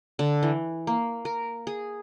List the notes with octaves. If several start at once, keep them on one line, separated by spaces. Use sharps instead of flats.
D3
E3
A#3
A#4
G#4